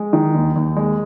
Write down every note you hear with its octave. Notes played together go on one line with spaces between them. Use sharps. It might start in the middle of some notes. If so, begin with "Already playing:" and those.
Already playing: G#3
D#3
D#2
D#2
G#3